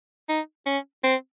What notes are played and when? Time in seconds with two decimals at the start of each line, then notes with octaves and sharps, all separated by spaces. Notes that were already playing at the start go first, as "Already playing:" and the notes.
0.29 D#4
0.66 C#4
1.04 C4